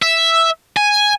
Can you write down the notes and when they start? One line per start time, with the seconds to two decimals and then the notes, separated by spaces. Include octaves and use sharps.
0.02 E5
0.77 G#5